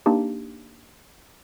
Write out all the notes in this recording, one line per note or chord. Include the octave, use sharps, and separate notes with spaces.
A#3 D4 D#4 G4